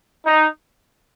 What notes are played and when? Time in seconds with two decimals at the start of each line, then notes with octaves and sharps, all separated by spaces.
0.24 D#4